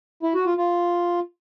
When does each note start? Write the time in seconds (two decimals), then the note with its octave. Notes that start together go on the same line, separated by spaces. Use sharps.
0.23 E4
0.35 F#4
0.46 F4
0.58 F4